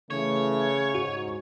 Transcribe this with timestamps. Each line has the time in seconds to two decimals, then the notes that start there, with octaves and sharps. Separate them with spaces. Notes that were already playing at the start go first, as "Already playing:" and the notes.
0.10 C#3 E3 A3 C#5
0.95 G#2 F#4